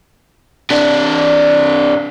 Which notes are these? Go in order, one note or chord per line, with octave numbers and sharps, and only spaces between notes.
C3 D4